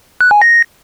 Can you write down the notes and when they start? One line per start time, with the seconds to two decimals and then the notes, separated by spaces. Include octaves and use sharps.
0.21 F#6
0.31 G#5
0.42 A#6